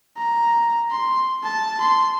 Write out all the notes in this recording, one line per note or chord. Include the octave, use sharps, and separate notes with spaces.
A#5
C6
A5
C6